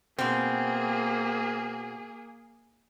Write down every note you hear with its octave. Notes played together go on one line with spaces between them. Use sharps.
B2 A#3 C4 G#4